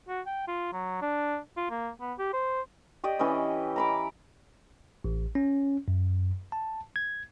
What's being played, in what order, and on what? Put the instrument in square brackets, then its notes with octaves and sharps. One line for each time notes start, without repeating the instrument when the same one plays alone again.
[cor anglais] F#4
G5
F4
F#3
D4
F4
A#3
B3
G4
C5
[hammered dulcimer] G4 D5 D#5
E3 C#4 B4 D#5
A#5 B5 D6
[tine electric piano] A1
C#4
F#2
A5
G#6